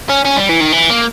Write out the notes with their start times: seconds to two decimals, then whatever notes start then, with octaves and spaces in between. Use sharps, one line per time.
0.09 C#4
0.25 C#4
0.37 G3
0.49 E3
0.61 D#3
0.73 E3
0.90 A#3